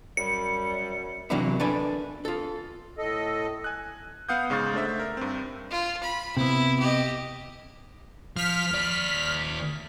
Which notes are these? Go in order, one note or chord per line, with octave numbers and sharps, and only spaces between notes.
F#2 G3 C#7
C3 E3 F#3 A#3 D4 E4
D4 A4 B4 G#5
F4 A4
A2 A4 D#5
G#5 F#6
B3 F5 F#5 D#6 G6
G#2 C#3 F5 C#6 A6
A3 D4 C5 E5
A#4
G2 C4
F4
B5
C3 B3 E4
G4 D#5
F3 F6 B6
D#2 D5